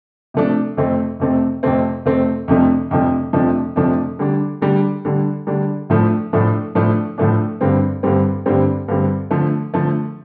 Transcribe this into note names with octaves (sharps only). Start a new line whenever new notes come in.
C3 F3 A3 D4
F2 C3 A3 C4
F2 C3 A3 C4
F2 C3 A3 C4
F2 C3 A3 C4
F2 C3 F3 A3 D4
F2 C3 F3 A3 D4
F2 C3 F3 A3 D4
F2 C3 F3 A3 D4
D3 G3 D4
D3 G3 D4
D3 G3 D4
D3 G3 D4
A2 F3 A3 D4
A2 F3 A3 D4
A2 F3 A3 D4
A2 F3 A3 D4
G2 D3 G3 C4
G2 D3 G3 C4
G2 D3 G3 C4
G2 D3 G3 C4
D3 F3 A3
D3 F3 A3